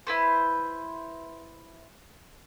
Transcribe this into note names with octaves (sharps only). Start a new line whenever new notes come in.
E4 B4 C5